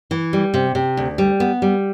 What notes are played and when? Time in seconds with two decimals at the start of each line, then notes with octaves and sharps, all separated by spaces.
0.11 E3
0.33 G3
0.54 C3
0.75 C3
0.97 D2
1.18 G3
1.40 B3
1.62 G3